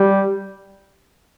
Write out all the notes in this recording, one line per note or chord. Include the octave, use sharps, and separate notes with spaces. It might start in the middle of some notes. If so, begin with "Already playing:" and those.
Already playing: G3